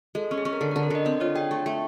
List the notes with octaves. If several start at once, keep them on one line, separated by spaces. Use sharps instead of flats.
G#3 A4
C#4
G#4
C#4
A#4
D3 A4
D3 A#4
A4
D3 D#5
C4 D#5
F4 C#5
G#4 G5
A3
A3